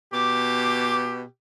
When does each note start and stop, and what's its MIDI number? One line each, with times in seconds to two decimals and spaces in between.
0.13 1.24 47
0.13 1.26 67
0.13 0.95 86